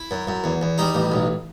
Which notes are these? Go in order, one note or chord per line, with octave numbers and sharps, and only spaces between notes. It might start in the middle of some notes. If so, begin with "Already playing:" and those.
Already playing: E4
F#2
F#2
E2
E2
G3 D#4
A1
B1